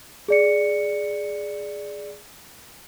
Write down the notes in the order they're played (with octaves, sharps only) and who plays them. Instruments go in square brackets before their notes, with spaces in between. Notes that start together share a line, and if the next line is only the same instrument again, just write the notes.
[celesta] G#4 D5 C#7